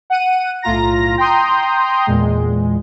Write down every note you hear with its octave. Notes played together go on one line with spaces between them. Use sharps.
F#5 D#7
B1 A2 F4 A#5 A#6
G5 A#5 C6 D#6 G6
E2 A#2 G#3